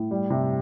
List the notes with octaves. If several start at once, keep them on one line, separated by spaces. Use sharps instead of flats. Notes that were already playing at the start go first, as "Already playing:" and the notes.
Already playing: A2
G3
C3